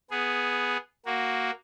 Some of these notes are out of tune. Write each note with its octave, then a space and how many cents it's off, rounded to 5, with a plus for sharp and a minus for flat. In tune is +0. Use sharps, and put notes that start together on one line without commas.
B3 +0 G#4 +0
A#3 +0 F#4 +0